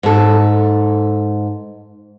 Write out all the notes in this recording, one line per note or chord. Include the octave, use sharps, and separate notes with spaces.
G#2 A4